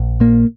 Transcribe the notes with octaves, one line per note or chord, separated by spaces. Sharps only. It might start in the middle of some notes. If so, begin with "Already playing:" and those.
Already playing: A#1
A#2 A#3